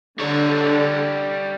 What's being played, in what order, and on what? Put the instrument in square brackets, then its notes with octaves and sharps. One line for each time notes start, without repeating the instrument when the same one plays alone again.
[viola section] D3 [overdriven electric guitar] G3 C#5